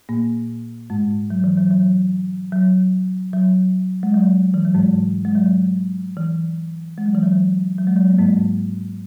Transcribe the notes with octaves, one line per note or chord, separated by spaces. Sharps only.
A#2 A#3
G#2 G#3
F#3
E3
F#3
F#3
F#3
F#3
G#3
F#3
E3
F#3
G#2 G#3
G#3
F#3
E3
G#3
F#3
E3
F#3
F#3
G#3
F#3
A#3
G#2 G#3